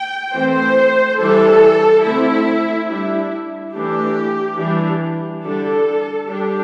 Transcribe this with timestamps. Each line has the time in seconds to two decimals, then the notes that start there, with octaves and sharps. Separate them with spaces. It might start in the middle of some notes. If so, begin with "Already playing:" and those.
Already playing: G5
0.34 E3 A3 C4 C5
1.19 E3 G3 D4 A4
2.04 D3 A3 C4 E4
2.89 G3 D4 E4
3.74 E3 A3 D4 G4
4.58 E3 G3 D4
5.44 D3 G3 D4 A4
6.28 G3 D4 G4